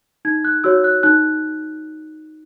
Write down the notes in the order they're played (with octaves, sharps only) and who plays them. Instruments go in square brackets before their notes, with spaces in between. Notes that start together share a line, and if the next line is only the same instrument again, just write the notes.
[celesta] D#4 G#6
F#6
F#4 C#5 E6
F#6
D#4 F#6